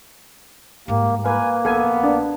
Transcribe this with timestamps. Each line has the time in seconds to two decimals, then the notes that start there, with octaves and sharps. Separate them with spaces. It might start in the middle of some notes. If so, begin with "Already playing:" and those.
0.88 G#2 G3 A#3 G4
1.24 A#3 A#4 B4 F5 G#5
1.65 A#1 B3 A4 G#5
2.04 D4